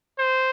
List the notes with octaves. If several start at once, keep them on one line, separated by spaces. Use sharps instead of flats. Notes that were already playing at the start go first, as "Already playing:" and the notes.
C5